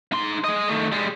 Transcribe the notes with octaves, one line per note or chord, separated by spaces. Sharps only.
D#4 C6
G#3 D#5
D#3 A3
G3 G#3